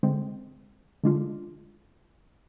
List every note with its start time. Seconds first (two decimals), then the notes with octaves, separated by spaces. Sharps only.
0.03 D3 G#3 C4
1.04 D3 G#3 D4 F4